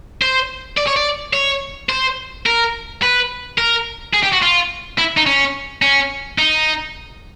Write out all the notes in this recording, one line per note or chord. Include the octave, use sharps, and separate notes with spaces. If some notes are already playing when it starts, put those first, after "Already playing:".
C5
D5
C#5
D5
C#5
C5
A#4
B4
A#4
G#4
G4
F#4
F4
E4
D#4
C#4
C#4
D#4